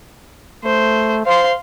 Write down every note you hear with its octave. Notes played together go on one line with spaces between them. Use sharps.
A3 C5
C5 F5 C6